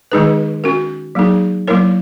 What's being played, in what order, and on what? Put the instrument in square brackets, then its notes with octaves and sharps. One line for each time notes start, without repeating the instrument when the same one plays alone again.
[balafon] D#3 G#3 D#4 G#4 B4
C#4 F#4 A#4
F#3 A#3 D#4 G#4
F#3 A#3 E4 A#4 C#5